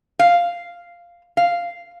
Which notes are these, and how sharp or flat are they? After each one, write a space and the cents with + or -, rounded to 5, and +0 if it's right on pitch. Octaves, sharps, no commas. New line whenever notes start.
F5 -5
F5 -5